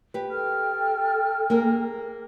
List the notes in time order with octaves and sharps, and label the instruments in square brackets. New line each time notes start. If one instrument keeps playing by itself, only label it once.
[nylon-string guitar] G4 B4
[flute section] A4 G5 F6
[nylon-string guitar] A#3 G#4 A#4